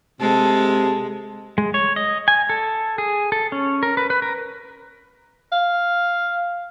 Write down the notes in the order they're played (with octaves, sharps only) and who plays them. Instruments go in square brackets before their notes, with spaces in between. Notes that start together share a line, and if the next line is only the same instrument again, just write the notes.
[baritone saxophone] C3 [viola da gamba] G#3 [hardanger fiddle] A4
[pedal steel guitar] G#3
C#5
D#5
G#5
A4
G#4
A4
C#4
A#4
B4
B4
A#4
[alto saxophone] F5